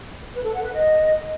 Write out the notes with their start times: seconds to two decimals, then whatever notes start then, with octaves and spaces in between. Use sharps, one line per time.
0.34 B4
0.44 A4
0.54 F#5
0.64 B4
0.73 D#5